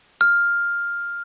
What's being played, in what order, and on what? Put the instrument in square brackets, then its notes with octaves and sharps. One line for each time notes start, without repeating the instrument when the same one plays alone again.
[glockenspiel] F6